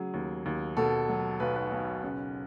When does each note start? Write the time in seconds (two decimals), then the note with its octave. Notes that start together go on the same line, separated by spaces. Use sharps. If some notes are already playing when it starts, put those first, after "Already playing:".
Already playing: C#3 F#3 G#4
0.14 D#2
0.46 D#2
0.77 B2 A4
1.09 F#3
1.40 B1 B4
1.56 B4
1.72 B1
2.04 C#3